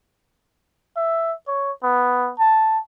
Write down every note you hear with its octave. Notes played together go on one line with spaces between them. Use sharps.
E5
C#5
B3
A5